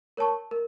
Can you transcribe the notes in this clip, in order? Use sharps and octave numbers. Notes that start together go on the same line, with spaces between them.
A#4 C#5 A5 C#6
A#4